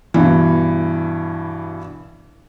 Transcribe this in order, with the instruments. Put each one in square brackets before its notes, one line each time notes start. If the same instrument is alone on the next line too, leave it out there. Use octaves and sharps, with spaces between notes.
[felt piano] G2 B2 E3